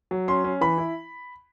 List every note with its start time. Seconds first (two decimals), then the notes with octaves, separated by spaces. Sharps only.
0.11 F#3
0.28 C#4 C6
0.44 C#4
0.61 E3 B5
0.78 E4